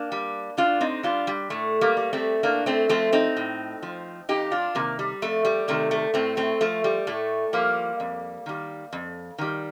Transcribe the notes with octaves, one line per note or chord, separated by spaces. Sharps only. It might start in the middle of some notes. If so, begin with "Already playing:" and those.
Already playing: A#3 D4
G3
A2 D4 F4
C4 D#4
G3 D4 F4
G3
A2 A3
G3 A#3
G3
A3 C4
A2 A#3 D4
A3 C4
F3 A3 C4
C4 D#4
A2
F3
F2 D#4 G4
D4 F4
C3 D#3 G3 A#3
G3
F2 A3
G3
C3 D#3 A3
A3
A2 A3 C4
A3 C4
F3 A3
G3
A2 A3
F3 G3 A#3
F2
D#3 G3
F2
D#3 G3